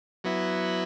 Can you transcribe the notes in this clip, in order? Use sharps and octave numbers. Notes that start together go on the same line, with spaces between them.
F#3 B3 E4